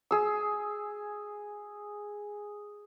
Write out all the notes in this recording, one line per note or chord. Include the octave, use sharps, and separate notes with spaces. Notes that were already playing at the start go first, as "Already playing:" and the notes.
G#4 E6